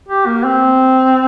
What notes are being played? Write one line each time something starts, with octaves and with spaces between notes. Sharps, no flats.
G4
A#3
C4